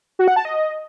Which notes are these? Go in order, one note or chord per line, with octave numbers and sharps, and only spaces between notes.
F#4
F#5
A5
D#5